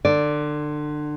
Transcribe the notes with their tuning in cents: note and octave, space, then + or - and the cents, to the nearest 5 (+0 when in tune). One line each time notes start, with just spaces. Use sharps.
D3 +30 D5 +0